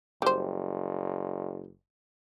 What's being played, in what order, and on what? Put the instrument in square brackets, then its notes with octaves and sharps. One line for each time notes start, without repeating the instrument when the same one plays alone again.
[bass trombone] F#1 [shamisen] G3 C5